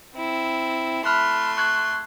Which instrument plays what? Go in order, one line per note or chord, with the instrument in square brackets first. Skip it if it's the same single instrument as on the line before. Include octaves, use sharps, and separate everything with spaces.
[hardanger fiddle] C4 E4
[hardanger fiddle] A3 C6 [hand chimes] B5 F6 F#6
[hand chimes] C#6 F#6 G#6